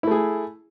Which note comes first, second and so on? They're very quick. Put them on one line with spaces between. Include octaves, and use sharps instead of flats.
E4 A3 G#4